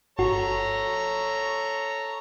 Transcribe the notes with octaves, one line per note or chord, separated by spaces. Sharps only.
G1 F#4 A4 C#5 A#5